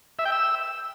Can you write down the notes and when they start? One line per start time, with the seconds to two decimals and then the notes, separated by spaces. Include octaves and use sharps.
0.19 E5
0.25 G5
0.32 E6